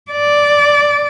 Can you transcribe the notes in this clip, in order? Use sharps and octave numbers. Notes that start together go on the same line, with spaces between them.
D5